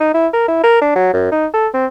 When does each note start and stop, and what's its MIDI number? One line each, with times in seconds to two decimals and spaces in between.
0.01 0.10 63
0.14 0.27 64
0.33 0.46 70
0.48 0.61 64
0.64 0.78 70
0.81 0.94 62
0.96 1.12 54
1.14 1.29 42
1.32 1.46 63
1.54 1.68 69
1.74 1.86 60